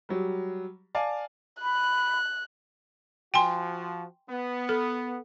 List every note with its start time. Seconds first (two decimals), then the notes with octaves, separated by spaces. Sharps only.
0.09 F#3 G3
0.95 D5 F5 G#5 A5
1.62 B5 F#6
3.34 F3 F#4 G5 G#5 C6
4.28 B3
4.69 A4